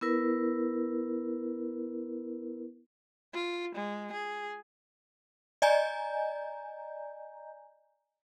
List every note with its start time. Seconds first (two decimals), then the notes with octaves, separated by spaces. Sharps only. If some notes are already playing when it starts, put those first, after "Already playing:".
0.01 B3 E4 A#4 B4
3.34 F4
3.75 G#3
4.13 G#4
5.62 D5 D#5 G#5 A#5 G6